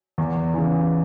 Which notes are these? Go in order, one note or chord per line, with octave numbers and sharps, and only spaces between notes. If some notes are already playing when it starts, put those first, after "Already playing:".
E2
C#3 E3